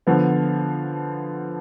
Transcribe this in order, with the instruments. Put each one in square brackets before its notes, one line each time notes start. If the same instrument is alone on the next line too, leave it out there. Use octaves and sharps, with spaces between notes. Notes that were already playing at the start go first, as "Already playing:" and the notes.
[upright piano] D3 F3 B3